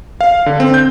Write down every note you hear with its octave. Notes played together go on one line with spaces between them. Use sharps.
F5
D3
C4
G6